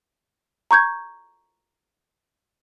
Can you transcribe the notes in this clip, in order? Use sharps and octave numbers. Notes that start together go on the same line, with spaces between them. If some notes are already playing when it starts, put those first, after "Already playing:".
A#5 C#6 G6 G#6